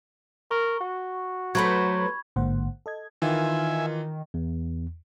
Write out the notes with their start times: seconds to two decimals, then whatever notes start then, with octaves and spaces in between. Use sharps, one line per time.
0.51 A#4 C#6
0.81 F#4
1.55 F#3 A3 B4 C5 B5 C#6 G#6
2.36 A1 G#2 D3 A#3 C5 F#5
2.86 A4 D#5 G#6
3.22 D#3 E3 F4 E5 G#5
4.34 E2